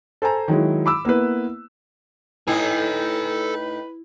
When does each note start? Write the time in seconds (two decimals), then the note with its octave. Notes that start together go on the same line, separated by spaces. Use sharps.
0.22 A4 C5 G#5 A#5
0.48 D#3 F#3 G#3 E4
0.86 B5 D6 E6
1.05 A#3 B3 E4 B4
2.48 A2 D#4 E4 A4 B4 G#5